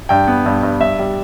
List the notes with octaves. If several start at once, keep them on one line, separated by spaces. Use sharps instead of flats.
G2 G5
B3
G2
G2
G2 E5
G3